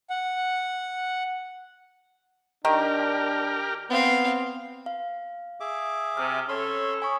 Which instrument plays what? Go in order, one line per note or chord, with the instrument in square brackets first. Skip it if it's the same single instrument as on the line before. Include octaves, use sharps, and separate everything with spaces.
[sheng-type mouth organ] F#5
[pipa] D#3 [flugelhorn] D4 [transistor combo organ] G4 A#4
[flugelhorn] B3 [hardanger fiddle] C4 F5
[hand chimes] F5
[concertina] G#4 E5 D6
[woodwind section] C3 [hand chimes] F6
[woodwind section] C#4 A4 C#5 [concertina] B5 C6
[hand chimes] G#5 C#6 D#6 [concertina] B5